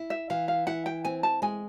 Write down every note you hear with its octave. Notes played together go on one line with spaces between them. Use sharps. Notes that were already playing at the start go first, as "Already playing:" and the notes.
Already playing: E4
E5
E3 F5
F5
E4 F#5
G5
C4 G#5
A5
G#3 G#5